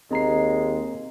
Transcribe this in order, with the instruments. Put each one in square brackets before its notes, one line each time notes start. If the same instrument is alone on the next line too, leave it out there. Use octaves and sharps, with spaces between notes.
[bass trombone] D#2 [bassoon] G#3 [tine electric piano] C4 A#5 C7